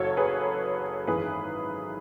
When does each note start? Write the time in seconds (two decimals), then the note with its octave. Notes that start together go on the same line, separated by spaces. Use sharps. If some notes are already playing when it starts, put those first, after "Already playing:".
Already playing: F#1 F#2 F#3 A4 C#5
0.17 G#4 B4
1.07 G#1 F#2 E3 G#4 B4